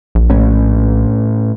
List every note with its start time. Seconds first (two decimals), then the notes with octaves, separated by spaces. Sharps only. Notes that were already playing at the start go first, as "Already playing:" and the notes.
0.15 A#1
0.30 A2 A3 C#4